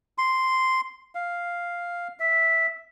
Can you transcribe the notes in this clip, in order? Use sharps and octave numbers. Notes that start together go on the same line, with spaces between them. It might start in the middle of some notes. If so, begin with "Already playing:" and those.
C6
F5
E5